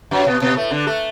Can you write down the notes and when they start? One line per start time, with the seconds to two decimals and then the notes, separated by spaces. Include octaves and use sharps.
0.11 F#2 F#3
0.27 B2 B3
0.42 B2 B3
0.56 A2 A3
0.71 D3 D4
0.86 A3 A4